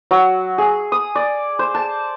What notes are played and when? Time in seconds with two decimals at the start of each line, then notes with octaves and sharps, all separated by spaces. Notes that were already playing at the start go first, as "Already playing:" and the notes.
0.11 F#3
0.58 G#4
0.92 D#6
1.15 D5
1.59 C5
1.74 A5